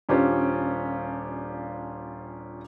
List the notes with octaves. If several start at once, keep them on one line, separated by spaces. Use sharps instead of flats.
D#1 C#4 D4 F4 G4 C5